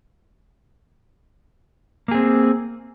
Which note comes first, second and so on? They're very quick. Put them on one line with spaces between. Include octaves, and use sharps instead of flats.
A#3 G#4 C4